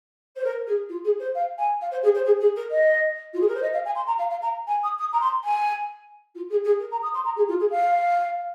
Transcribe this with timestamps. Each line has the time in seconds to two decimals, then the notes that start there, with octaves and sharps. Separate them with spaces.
0.36 C5
0.44 A#4
0.67 G#4
0.89 F4
1.04 G#4
1.19 C5
1.34 F5
1.58 G#5
1.81 F5
1.91 C5
2.03 G#4
2.14 C5
2.25 G#4
2.40 G#4
2.56 A#4
2.71 D#5
3.33 F4
3.40 G#4
3.47 A#4
3.55 C5
3.62 D#5
3.73 F5
3.85 G#5
3.95 C6
4.06 A#5
4.18 F5
4.30 F5
4.42 A#5
4.67 G#5
4.83 D#6
4.98 D#6
5.13 A#5
5.20 C6
5.44 G#5
6.35 F4
6.49 G#4
6.64 G#4
6.79 A#4
6.91 A#5
7.02 D#6
7.14 C6
7.24 A#5
7.36 G#4
7.48 F4
7.59 G#4
7.70 F5